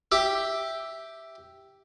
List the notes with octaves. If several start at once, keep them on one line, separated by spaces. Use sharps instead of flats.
G4 E5